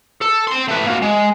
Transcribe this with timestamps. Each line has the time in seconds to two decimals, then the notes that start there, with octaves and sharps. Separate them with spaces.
0.21 A4
0.47 C4 C6
0.68 A3 B4
0.87 A#3 F#4
1.02 G#3